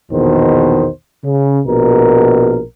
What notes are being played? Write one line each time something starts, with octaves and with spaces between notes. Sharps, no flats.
A#1 E2 B2 D#3 C5
C#3
A#1 B2 A#4